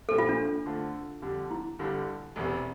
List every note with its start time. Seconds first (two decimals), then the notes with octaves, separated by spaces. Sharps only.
0.09 A#1 A#2 G3 C4 A4
0.18 F4
0.29 D4
0.66 D3 A3 C4 F4
1.22 F2 D3 G3
1.51 E4
1.79 G1 G2 D3 G3
2.36 E1 E2 C3